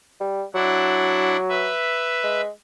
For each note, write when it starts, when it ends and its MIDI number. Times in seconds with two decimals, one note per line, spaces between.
0.20 0.44 55
0.54 1.69 54
0.54 1.37 62
0.54 1.37 64
0.54 1.37 78
1.49 2.41 71
1.49 2.41 76
2.24 2.48 56